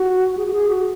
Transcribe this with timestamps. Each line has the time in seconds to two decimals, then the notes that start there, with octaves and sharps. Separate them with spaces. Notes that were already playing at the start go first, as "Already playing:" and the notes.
Already playing: F#4
0.37 G#4
0.46 F#4
0.53 G#4
0.68 F#4